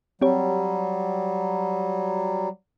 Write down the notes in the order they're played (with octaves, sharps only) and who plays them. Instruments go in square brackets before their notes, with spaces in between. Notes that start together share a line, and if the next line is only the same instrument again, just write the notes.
[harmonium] F#3 G3 [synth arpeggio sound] C4 G4 C#5